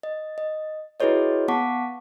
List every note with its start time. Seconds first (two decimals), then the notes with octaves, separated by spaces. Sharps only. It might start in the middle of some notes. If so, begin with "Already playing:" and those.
0.03 D#5
0.38 D#5
1.00 E4 F#4 G#4 B4 C#5 D#5
1.48 B3 F#5 A5 C#6 D6 B6